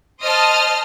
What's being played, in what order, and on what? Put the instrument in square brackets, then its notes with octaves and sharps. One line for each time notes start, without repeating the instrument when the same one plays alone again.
[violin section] C5 D#5 A5 D#6 F6